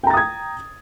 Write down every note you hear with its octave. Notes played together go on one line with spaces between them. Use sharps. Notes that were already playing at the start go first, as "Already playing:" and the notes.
G5 A#5 D#6 G#6 A6